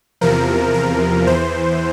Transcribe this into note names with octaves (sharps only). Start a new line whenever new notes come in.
E2 C3 F3 A#4
A#4
E2 E3 C5